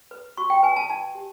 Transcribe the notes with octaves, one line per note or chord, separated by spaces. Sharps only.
B4
F#4 C#6
G5
B4 G#5
A5
D#4 A5
G4